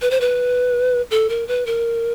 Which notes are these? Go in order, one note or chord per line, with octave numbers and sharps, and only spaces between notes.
B4
C5
B4
A4
A#4
B4
A#4